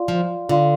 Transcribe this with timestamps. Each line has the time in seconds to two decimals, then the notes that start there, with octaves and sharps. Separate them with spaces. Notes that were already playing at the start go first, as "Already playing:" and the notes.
Already playing: F4 D5 F5 C6
0.08 F3
0.49 D3 F4 D5 F5 C6